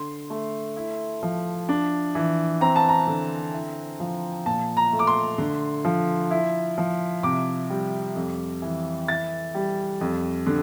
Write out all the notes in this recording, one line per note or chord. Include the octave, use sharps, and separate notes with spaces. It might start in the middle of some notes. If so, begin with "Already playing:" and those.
Already playing: D3 C6
A3
E4
F3
D4
E3
C4 A#5
A5
A#5
D3
E4
F3
A#2 A5
A#5
A3
D6
C6
D3
F3
E4
F3
C3 D6
G3
F2
E3
E4 A6
G3
F2
D3